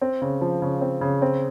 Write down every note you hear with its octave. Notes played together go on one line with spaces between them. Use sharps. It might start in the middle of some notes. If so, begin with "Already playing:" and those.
C4
C#3
F3
C#3
C4
C#3
C4